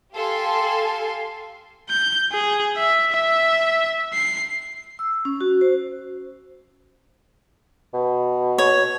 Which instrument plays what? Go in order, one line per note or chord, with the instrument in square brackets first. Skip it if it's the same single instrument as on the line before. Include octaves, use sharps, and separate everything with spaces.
[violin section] G4 A4 F5 G#5 C6
[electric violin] G6
G#4
E5
E5
C7
[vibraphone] E6
C#4
F#4
C5
[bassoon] B2
[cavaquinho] C#5